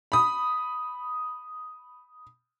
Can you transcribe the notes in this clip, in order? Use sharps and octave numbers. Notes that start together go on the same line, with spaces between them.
B5 D#6